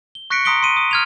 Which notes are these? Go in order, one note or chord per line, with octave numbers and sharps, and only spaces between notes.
G7
C#6 F#6 A#6 B6 C#7 D7
A#5 C6 D#6 B6 D7 G7
C6 D#7
D#6
F6 G#6 F7